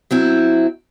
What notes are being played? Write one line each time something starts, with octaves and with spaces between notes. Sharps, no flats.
F#3 C4 E4